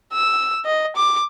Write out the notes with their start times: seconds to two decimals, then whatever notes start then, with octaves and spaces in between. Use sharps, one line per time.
0.13 E6
0.65 D#5
0.96 D6